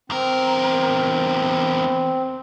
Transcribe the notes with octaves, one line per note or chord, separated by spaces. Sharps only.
E2 C4 A#4